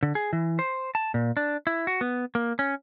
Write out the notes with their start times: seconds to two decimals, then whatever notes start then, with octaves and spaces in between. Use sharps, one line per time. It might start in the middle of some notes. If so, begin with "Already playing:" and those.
0.03 D3
0.15 G#4
0.33 E3
0.59 C5
0.95 A5
1.14 A#2
1.37 D4
1.67 E4
1.87 F#4
2.01 B3
2.35 A#3
2.59 C#4